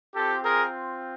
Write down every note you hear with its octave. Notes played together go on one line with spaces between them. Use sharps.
C4 F4 G4 A4
G#4 A#4